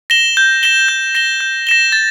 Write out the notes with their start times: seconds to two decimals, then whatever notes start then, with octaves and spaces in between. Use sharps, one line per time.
0.10 A#6 E7 G7
0.37 G6
0.63 A#6 E7 G7
0.88 G6
1.15 A#6 E7 G7
1.40 G6
1.67 A#6 E7 G7
1.92 A6